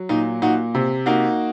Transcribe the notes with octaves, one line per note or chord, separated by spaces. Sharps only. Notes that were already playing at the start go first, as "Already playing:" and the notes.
Already playing: F#3
A#2 D#4
A#2 D#4 F#4
C3
A#3 D#4 F#4